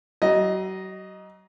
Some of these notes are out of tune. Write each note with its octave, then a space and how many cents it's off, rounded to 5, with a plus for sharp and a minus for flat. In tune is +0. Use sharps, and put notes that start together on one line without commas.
F#3 +35 D#5 +0